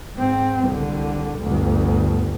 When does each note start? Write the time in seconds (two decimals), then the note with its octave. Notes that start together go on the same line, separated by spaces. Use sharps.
0.16 G#2 C4
0.66 C2 D3
1.39 G1 D2